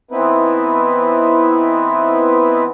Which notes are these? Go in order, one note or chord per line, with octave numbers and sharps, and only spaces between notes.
E3 B3 C4 D#4 E4 B4